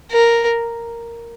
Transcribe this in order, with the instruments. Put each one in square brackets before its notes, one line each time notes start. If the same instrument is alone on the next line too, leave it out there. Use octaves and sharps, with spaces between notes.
[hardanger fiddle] A#4